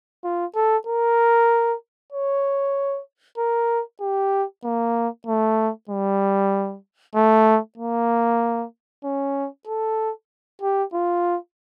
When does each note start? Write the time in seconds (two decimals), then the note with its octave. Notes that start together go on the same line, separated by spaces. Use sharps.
0.24 F4
0.55 A4
0.87 A#4
2.12 C#5
3.38 A#4
4.01 G4
4.64 A#3
5.27 A3
5.89 G3
7.15 A3
7.78 A#3
9.04 C#4
9.67 A4
10.62 G4
10.93 F4